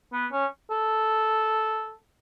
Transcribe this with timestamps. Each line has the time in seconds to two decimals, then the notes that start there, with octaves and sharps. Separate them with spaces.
0.12 B3
0.32 C#4
0.71 A4